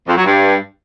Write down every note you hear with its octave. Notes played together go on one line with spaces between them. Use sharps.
F2
F#3
G2